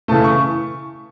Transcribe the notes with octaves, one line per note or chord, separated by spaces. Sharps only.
C#3 E3 A3 A5
C#6